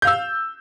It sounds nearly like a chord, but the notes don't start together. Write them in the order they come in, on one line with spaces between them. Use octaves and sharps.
G6 F5 E6